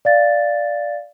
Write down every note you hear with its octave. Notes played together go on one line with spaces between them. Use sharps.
D5 F5 A6